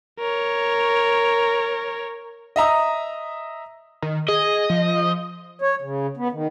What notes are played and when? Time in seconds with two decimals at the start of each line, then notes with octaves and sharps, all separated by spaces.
0.19 A#4 C#5
2.56 D#5 E5 A#5 D#6
4.02 D#3
4.28 G#4 D#5
4.70 F3
5.62 C#5
5.81 C#3
6.17 B3
6.32 D#3